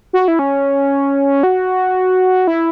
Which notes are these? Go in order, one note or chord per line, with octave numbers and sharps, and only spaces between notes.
F#4
E4
C#4
F#4
E4